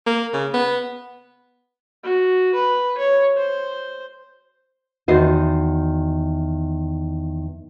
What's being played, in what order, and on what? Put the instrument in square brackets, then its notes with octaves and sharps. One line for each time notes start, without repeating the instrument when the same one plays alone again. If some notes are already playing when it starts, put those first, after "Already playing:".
[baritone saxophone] A#3
C#3
B3
[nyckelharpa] F#4
B4
C#5
C5
[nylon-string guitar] E2 D#3 F#4 C5 D#5